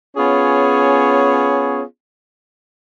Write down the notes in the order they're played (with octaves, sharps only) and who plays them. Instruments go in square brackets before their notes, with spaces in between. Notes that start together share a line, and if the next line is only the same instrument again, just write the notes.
[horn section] B3 C#4 F4 G#4 C#5